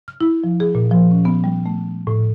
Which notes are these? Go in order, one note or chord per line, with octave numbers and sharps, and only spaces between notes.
F6
E4
F3
G#4
A#2
F3
C#4
B3
G3
A3
A2